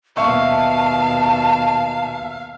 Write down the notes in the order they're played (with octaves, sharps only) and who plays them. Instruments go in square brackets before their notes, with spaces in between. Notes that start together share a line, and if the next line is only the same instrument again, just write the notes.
[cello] D#2 B2 [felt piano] E5 C#6 [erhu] F5 [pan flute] A5